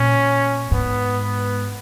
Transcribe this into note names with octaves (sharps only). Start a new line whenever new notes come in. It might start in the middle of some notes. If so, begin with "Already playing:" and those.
Already playing: A#2 C#4
G#2 B3
B3